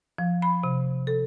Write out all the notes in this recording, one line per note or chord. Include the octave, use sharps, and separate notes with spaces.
F3
B5
C3
A4